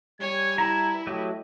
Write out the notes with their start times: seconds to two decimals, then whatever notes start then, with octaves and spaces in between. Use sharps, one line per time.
0.21 G3 C#5 G#5 G#6
0.58 E4 B4 A5 A#5
1.07 F#3 A3 G4 D#5